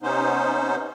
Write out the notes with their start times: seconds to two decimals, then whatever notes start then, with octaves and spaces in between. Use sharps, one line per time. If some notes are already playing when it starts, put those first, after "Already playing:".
0.03 C3 B3 C#4 D#4 C5